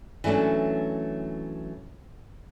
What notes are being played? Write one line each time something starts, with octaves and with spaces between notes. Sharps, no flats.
E3 F#3 A3 C#4 D4